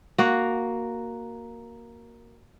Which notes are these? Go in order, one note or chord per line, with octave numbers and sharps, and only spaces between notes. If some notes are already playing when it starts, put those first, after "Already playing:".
A#3 F#4